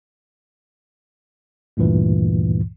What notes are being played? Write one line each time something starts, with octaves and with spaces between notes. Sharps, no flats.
D2 G2 A#2 E3